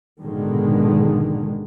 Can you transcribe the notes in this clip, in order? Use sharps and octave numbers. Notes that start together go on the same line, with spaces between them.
A#1 G#2 B2 D3 D#3 G#3